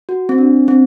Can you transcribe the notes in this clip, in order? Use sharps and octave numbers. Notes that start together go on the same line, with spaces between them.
F#4
C4
D4
C4